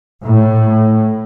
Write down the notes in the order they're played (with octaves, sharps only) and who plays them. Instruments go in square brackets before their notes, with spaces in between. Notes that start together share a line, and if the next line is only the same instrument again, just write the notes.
[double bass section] A2